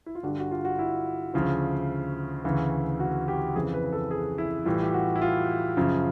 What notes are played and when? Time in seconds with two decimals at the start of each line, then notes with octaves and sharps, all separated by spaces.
0.06 E4
0.15 F4
0.23 G2 D3 G3 F#4
0.39 F#4
0.51 F4
0.65 F#4
0.79 E4
1.34 D2 C#3 F3
2.44 D2 C#3 E3
3.00 F#4
3.28 G4
3.56 F2 C#3 E3 G#4
3.74 B4
3.93 A4
4.11 G#4
4.38 E4
4.65 A2 E3 G3 F4
4.83 G4
4.94 F#4
5.16 E4
5.21 F4
5.77 F#2 C#3 F3